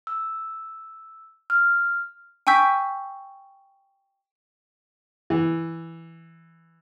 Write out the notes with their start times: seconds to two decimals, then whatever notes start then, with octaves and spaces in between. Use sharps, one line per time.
0.07 E6
1.50 F6
2.47 G5 G#5 C#6 E6 G6 B6
5.30 E3